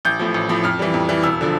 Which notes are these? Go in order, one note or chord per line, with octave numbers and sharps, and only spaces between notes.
A1 G6
A2 F3
A1
A2 F3
F2 F6
E3 G3
F2
E3 G3
E1 E6
D3 F3